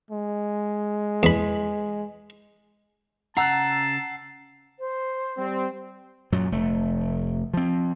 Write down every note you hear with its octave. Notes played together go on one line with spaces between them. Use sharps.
G#3
E2 B5
C#3 F#5 A5 A#5 E6 F#6 C7
C5
G3 C4
F#2 A#2 F#3
F1 A3
F3 C4